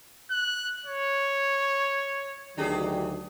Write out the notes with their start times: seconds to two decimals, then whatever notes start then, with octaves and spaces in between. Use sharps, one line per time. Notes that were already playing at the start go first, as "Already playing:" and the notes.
0.30 F#6
0.86 C#5
2.57 D2 D#3 F#3 D4 G4 G#4